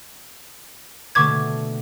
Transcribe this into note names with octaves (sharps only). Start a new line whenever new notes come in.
B2 D3 A3 C#6 D6 G#6